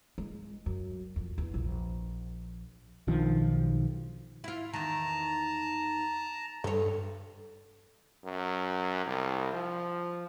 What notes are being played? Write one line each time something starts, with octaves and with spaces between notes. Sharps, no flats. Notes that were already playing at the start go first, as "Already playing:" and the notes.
G#3
F#2
F2
E2
A#1
B1 D#3 F3 D4
E4 F4
E2 D#3 A5 A#5
G2 A4 C#5
F#2
C2
F3